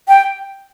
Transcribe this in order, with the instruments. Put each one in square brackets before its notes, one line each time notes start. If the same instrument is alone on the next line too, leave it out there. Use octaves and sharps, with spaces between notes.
[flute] G5